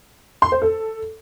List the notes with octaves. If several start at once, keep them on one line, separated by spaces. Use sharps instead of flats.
C6
C5
A4